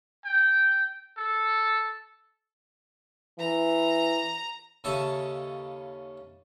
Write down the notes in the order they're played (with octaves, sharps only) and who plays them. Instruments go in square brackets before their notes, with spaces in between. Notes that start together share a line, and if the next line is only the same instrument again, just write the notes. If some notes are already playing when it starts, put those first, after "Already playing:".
[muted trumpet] G5
A4
[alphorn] E3 [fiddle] A#5
[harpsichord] D#2 C#3 A4 D#5 E5